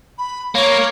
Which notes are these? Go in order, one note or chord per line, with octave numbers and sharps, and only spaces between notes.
B5
A#3 C#5